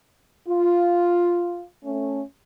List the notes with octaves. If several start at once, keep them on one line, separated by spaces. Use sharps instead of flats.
F4
A3 C#4